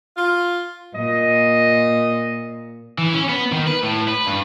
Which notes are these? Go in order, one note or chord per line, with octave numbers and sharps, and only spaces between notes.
F4
A#2 D#5
E3
C#4
B3
D#3
B4
A2
B4
G2